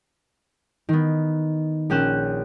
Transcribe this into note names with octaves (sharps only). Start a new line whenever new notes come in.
D#3 B3
A#1 A#3 C#4 G5 F#6 E7